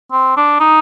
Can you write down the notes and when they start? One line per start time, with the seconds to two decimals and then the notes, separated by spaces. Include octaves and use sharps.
0.12 C4
0.37 D4
0.60 D#4